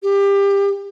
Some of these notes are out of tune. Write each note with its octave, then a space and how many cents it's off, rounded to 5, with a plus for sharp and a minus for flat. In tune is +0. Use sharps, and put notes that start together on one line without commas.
G4 +25